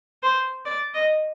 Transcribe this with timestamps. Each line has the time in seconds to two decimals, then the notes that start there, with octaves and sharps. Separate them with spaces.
0.23 C5
0.66 D5
0.94 D#5